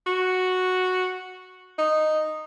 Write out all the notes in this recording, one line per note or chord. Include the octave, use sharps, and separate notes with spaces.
F#4
D#4